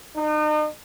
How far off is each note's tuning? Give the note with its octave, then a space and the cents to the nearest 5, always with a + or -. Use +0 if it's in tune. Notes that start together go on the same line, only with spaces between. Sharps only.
D#4 -40